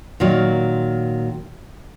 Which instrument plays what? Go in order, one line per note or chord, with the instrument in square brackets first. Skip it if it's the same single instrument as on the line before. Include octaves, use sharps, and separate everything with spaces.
[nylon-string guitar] A#2 D#3 F#3